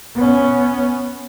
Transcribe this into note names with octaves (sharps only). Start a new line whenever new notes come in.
B3 C#4